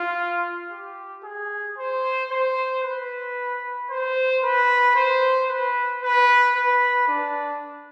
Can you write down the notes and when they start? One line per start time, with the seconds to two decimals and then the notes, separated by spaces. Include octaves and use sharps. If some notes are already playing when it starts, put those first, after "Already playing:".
Already playing: F4
0.71 G4
1.24 G#4
1.78 C5
2.31 C5
2.83 B4
3.90 C5
4.43 B4
4.96 C5
5.50 B4
6.03 B4
6.55 B4
7.08 D4